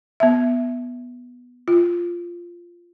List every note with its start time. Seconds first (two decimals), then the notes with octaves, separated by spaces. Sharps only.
0.20 B3 E5
1.68 F4